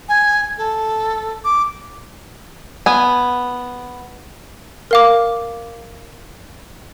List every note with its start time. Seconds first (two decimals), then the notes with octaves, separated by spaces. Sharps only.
0.09 G#5
0.58 A4
1.45 D6
2.86 B3 G#5
4.91 A#4 F5 D6